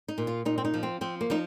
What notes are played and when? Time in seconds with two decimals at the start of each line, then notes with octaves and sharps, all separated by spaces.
0.08 D#4
0.18 A#2
0.27 F4
0.45 A#2 D#4
0.58 C4
0.65 D#4
0.74 F3
0.83 C4
1.01 F3 C4
1.21 A#3
1.30 F3 D#4